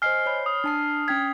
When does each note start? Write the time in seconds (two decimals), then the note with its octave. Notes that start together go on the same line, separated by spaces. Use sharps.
0.02 C5 D#5 G#5 F6 C7
0.26 C#5 B5
0.46 D#6
0.64 D4 A5 C7
1.08 C#4 G5 G#6 B6